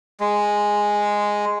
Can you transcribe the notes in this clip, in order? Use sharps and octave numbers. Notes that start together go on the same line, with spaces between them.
G#3